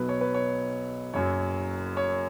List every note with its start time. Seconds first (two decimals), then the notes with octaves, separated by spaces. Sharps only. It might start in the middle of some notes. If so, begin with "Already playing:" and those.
Already playing: B1 B2 F#3 B4
0.09 C#5
0.21 B4
0.34 C#5
1.13 F#1 F#2 F#3 C#5
1.97 C#5